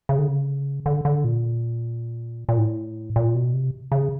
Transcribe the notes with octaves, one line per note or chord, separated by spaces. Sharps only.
C#3
D3
C#3
D3
D3
A#2
A#2
A2
A#2
B2
C3
C#3